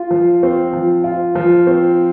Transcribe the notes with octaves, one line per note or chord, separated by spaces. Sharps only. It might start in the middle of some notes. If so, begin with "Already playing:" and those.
Already playing: F4
F3
C4
F3
F4
F3
C4